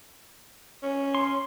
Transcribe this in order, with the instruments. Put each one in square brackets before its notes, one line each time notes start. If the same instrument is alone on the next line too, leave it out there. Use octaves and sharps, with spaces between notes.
[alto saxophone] C#4
[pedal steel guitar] C6